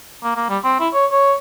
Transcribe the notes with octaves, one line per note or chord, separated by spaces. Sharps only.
A#3
A#3
G3
C4
E4
C#5
C#5